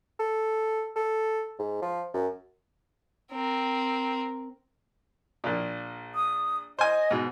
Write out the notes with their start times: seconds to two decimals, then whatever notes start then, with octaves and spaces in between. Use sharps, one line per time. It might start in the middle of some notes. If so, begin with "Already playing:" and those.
0.19 A4
0.96 A4
1.59 G#2
1.82 F3
2.14 F#2
3.32 C4 A#4
5.44 A#1 A#2
6.15 D#6
6.79 C5 D#5 G#5
7.11 G#2 B2